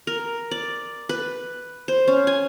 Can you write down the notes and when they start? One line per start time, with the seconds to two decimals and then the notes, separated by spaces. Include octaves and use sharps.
0.07 A#4
0.51 D5
1.09 B4
1.88 C5
2.07 C#4
2.27 G#5